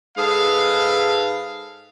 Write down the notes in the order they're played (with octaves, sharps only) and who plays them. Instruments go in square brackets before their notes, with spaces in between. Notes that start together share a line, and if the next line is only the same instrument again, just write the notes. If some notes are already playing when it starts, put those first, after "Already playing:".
[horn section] G#2 G#4 A4 B4 F5